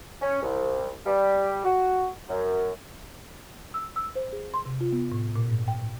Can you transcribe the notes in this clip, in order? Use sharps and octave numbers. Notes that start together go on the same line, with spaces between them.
C#4
C2
G3
F#4
F#2
E6
E6
C5
G#4
C6
C3
F4
B3
A2
A#2
G#2
G5